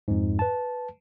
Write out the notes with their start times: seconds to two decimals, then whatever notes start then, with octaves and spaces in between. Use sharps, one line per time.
0.08 F2 G#2
0.39 B4 A5